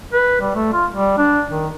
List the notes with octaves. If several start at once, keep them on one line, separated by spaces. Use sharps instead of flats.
B4
G3
A3
F4
G3
D4
D#3